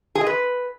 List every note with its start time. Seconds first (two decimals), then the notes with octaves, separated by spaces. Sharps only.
0.15 G#4
0.21 D#5
0.27 B4